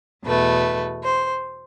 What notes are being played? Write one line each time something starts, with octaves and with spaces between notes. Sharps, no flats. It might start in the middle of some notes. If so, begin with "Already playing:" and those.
E2 B2 A3 B4
C5